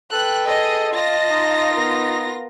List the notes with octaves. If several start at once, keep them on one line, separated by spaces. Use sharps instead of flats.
A4 B4 G5 F#6
G#4 A4 D#5
F4 D#5 A5 A#6
D#4
B3 A#4